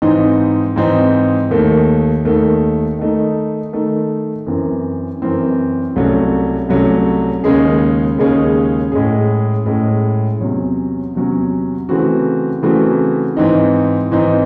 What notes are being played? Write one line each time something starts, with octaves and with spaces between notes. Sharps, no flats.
G#2 E3 C4 D#4
G#2 E3 C4 D#4
D#2 D#3 A3
D#2 D#3 A3
D#3 A3 D#4
D#3 A3 D#4
F#2 E3 C4
F#2 E3 C4
C2 C3 F#3 A3 C#4
C2 C3 F#3 A3 C#4
D#2 C#3 G#3 C#4 G#4
D#2 C#3 G#3 C#4 G#4
A2 G#3 C#4 G#4
A2 G#3 C#4 G#4
E2 C3 F#3 C#4
E2 C3 F#3 C#4
C#3 E3 A3 C4 F#4
C#3 E3 A3 C4 F#4
G#2 E3 C4 D#4
G#2 E3 C4 D#4